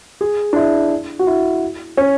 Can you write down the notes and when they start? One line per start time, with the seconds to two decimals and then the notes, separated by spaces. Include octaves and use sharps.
0.21 G#4
0.53 D4
0.56 E4
1.19 F#4
1.27 E4
1.97 C#4